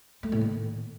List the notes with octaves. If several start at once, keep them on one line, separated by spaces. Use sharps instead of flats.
A3
A2
D#3